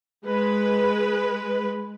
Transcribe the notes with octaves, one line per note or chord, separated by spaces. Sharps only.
G#3 B4